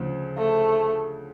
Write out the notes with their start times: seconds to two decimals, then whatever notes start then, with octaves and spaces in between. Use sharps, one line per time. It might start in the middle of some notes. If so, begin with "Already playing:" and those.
Already playing: D2 C#3 F3
0.38 A3